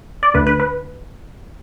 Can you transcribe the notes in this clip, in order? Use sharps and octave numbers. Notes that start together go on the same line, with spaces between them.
D5
D2 D3 A3 B4
B4
B4